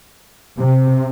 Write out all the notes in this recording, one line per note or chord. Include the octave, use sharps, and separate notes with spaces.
C3